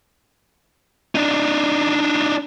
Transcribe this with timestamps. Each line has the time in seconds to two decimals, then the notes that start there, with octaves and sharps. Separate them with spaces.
1.15 D4 D#4